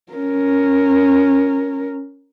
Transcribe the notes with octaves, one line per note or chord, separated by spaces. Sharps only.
C#4 A#4